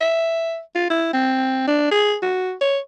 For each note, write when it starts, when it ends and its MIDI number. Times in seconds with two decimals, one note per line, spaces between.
0.01 0.60 76
0.75 0.86 65
0.90 1.09 64
1.13 1.65 60
1.67 1.89 62
1.91 2.16 68
2.22 2.54 66
2.61 2.79 73